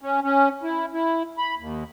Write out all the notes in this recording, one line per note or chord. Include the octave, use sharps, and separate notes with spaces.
C#4
C#4
E4
E4
B5
D#2